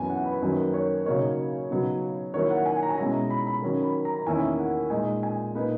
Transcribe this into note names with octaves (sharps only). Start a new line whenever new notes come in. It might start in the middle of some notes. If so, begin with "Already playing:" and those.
Already playing: F#2 E3 B3 E4 G#5
F#5
B4
F#2 D#3 F#3 A#3 B4
C#5
C#3 F#3 A#3 D#4 C#5
C#3 F#3 B3 D#4
D#3 F#3 A#3 E4 C#5
F#5
G#5
G#5
A#5
G#5
B2 G#3 C#4 E4 A#5
B5
B5
D#3 F#3 C#4
B5
A#5
E2 D#3 A#3 C#4 E4 G#5
F#5
A#2 G#3 D#4 G#5
G#5
A#2 A#3 D#4 B4